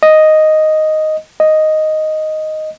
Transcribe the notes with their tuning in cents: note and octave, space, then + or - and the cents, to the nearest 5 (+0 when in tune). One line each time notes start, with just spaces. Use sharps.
D#5 +0
D#5 +0